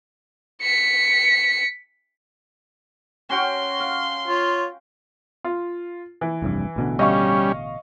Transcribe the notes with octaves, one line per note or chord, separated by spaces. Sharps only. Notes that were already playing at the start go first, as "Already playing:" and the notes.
B6 C#7
C#4 F#4 G5 C6
F5
F4 C#5
F4
E3
F1 C2 G2
A1 B2 D3
G3 C#4 D#5 F5 C#6